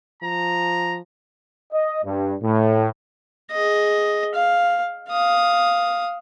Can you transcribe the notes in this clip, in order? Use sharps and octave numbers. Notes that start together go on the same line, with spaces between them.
F3 A#5
D#5
G2
A2
G#4 D#5
F5
F5 D#6